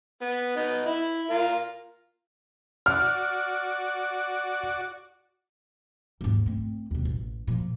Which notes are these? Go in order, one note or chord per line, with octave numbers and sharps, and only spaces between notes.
B3
B3 D#4
E4
F4 A#4
F#4 D5 F6
D#2 G#2
A3 C4
D#2 C3
A1
A#2 F3